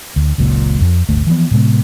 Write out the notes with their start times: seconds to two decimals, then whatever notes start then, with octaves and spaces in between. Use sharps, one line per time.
0.16 D2
0.38 F#1 C#2 F#2 A#2
0.81 F2
1.09 D1 G1 D2 A3
1.27 E3 F3 B3
1.51 A2 C3 G#3 B3